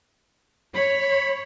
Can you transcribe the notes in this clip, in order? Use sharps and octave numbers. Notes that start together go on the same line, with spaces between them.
C#5 B5